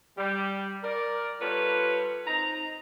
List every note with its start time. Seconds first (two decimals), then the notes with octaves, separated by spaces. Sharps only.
0.17 G3
0.84 A#4 D5
1.41 G3 F4 A4 B4 C#5
2.27 C4 D#4 A#5